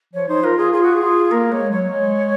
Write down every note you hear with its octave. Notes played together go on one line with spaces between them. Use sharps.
F3 C#5
D#4 C5
F4 A#4
F4 G#4
F4 G#4
F#4
G#4
F4
A#3 A#4
G#3 C#5
F#3 C#5
G#3